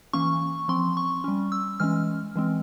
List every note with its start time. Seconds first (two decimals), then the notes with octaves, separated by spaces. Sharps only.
0.13 E3 A#3 C#4 C#6
0.68 F3 C4 C6
0.97 C#6
1.24 G3 C#4
1.52 E6
1.80 E3 G#3 C#4 F6
2.36 E3 G#3 C4